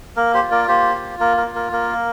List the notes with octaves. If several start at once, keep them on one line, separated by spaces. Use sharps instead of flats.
A#3 A#4
G4 C5
F4
A#4 D5
A#3 G4 C5
F4
A#3 A#4
A#4
F4
A#4
A#3 A#4